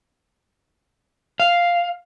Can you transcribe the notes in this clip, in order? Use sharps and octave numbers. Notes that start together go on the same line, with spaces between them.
F5